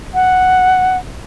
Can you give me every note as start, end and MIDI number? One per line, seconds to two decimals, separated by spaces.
0.14 0.97 78